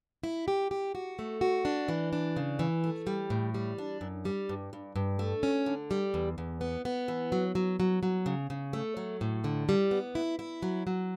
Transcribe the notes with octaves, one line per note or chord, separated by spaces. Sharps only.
E4
G4
G4
F#4
A3
F#4
D4
E3
D4
C#3
E3
A3
G3
A2
G3
D4
F#2
G3
G2
G2
G2
A3
C#4
D3
G3
E2
E2
B3
B3
E3
F#3
F#3
F#3
F#3
C#3
C#3
A3
F#3
A2
D3
G3
B3
E4
E4
F#3
F#3